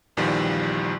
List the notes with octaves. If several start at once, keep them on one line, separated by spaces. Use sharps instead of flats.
A#1 E2 A#2 D#3 F3 G3